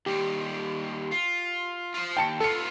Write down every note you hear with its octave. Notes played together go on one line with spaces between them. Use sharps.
D#2 G3 G4
F4
F4 C5
D#2 G5 A5 C#7
B3 F4 A4 C#7